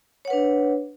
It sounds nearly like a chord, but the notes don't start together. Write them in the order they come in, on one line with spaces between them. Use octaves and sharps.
C#5 F#5 B4 D4